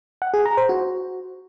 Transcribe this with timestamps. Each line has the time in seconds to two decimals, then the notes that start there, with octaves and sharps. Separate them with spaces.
0.22 F#5
0.34 G#4
0.45 A#5
0.57 C5
0.69 F#4